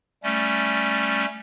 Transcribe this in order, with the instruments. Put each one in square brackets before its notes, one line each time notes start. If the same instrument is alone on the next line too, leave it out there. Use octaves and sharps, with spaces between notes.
[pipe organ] G3 A3 C#4